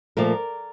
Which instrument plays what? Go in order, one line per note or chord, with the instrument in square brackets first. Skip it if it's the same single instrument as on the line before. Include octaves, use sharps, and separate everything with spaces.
[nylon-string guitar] A#2 F3 A3 A#4 D5